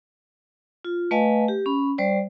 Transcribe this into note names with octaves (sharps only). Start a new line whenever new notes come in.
F4
A3 B4 D#5 F5 G#5 A5
G4
C#4 B5
G3 C5 D5